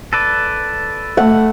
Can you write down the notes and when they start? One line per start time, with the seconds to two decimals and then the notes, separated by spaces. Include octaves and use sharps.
0.13 A4 B4 D5
1.17 A3 F#5